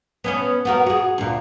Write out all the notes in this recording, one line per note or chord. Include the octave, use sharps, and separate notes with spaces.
B3 C#4 C#5
B3 F#4 A#4
F#4 G#4
D2 A#2